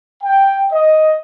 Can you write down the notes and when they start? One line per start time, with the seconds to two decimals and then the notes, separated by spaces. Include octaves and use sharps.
0.23 G5
0.72 D#5